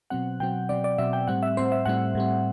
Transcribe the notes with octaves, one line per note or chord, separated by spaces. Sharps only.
B2 F#3 C4 F#5
B2 F#3 C4 G5
B2 F#3 C4 D5
D5
B2 F#3 C4 E5
G5
A2 G3 C4 F#5
E5
A2 G3 C4 C5
E5
A2 G3 C4 F#5
A2 G3 C4